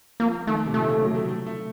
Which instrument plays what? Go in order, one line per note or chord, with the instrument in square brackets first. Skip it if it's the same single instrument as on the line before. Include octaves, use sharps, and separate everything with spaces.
[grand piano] F3 [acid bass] A#3
[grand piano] D#3 [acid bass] A3
[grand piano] C3
[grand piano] A#2 [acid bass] A3
[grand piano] C#3
F#3
A3
A3
A3